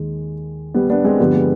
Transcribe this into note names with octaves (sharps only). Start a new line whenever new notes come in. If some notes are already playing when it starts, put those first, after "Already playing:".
Already playing: D#2 D#3 G#3
G3 B3
B3 D4
G#3 C4
G2 D3 F3 G3 B3
G#3